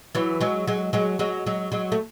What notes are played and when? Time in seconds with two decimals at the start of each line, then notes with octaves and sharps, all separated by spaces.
0.15 E3 F#3
0.41 F#3 G#3
0.68 F#3 G#3
0.93 F#3 G#3
1.19 F#3 G#3
1.46 F#3 G#3
1.72 F#3 G#3
1.92 A3